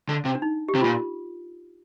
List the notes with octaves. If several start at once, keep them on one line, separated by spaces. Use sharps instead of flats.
D3
C3
D4
D#4
G4
C3
A#2 F4